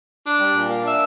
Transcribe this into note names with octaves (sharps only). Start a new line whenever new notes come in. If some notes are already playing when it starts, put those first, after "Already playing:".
D4
G3
A#2
A#3
D4 E5